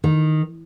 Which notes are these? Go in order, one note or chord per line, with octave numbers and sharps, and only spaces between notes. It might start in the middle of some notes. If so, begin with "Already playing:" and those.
D#3